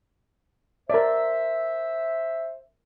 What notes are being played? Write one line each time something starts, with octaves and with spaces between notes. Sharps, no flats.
A#4 C5 D5 E5